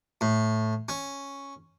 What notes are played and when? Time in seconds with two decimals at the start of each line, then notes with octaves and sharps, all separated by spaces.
0.21 A2
0.89 C#4